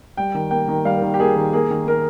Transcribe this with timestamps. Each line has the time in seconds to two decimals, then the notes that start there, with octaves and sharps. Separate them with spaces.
0.17 G3 G5
0.34 D#3
0.51 A#3 G5
0.68 D#3
0.85 G3 F5
1.02 D#3
1.14 G4
1.20 A#3 G#4
1.36 D#3
1.53 A#3 G#4
1.70 D#3
1.87 D#3 A#4